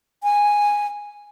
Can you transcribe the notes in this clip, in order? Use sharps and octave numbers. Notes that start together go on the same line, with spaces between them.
G#5